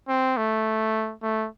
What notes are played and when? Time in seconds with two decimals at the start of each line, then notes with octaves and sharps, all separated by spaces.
0.09 C4
0.37 A3
1.23 A3